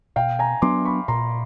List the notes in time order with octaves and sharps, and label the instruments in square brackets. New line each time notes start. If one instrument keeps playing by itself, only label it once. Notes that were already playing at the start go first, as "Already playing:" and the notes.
[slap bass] B2 [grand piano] F5 G5
[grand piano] G#5 A#5
[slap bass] F#3 B3 D4 [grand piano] C6 D6
[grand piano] B5 C#6
[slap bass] A#2 [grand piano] A#5 C6